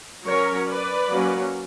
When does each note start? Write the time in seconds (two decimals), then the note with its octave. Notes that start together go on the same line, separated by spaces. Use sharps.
0.26 F#3 C#4 A#4 C#5
0.68 B4 D5
1.10 F#3 A#3 C#4